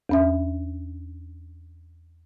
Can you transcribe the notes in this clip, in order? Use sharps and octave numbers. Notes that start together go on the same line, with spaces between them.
E2 C#4 E5